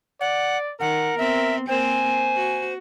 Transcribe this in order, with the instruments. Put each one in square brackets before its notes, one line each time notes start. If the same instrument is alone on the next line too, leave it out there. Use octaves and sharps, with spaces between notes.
[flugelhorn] D5 [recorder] F#5
[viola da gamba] D#3 [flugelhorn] A#4 [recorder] F#5
[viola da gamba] B3 C4 [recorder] E5
[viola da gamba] A#3 C4 A#4 [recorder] C5 [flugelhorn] G#5
[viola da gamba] F#4